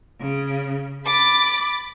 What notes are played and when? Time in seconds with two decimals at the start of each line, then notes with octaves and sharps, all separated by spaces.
0.20 C#3
1.06 B5 D6 A6